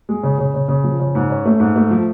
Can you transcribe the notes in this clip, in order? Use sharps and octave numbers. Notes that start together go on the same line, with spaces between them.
G#3
C#3
C#3
C#3
C#3
F3
C#3
G#2
C#4
A3
G#2
A3
F3